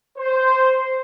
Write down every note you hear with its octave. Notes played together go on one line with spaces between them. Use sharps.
C5